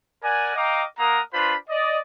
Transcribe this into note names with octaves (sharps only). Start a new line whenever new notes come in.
A#4 D5 F#5 G#5
D#5 F5 G5 A#5 D6
A#3 A#4 F#5 A#5 D#6
D4 F4 B4 C5 B5
D5 D#5